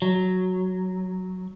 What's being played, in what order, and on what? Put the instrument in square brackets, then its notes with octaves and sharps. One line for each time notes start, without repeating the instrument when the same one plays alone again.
[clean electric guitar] F#3